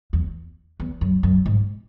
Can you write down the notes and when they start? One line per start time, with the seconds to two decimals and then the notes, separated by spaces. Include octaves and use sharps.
0.13 E2
0.80 E2
1.01 F#2
1.23 F#2
1.46 G#2